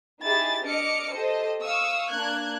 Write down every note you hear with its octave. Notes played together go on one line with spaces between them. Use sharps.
D#4 E4 G4 G#4 A6
D4 D#5 D6 F6 C#7
G4 A4 C5 D#5
F5 C#6 D#6 E6
A#3 D4 F#6 G#6